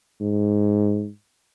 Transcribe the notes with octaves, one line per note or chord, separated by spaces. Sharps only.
G#2